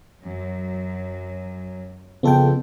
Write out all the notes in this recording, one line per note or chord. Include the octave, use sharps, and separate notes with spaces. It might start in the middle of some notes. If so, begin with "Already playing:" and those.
F#2 F#3
F2 C#3 B3 A4 G5